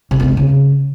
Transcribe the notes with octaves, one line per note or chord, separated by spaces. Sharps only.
C3
B3
G#3
C#3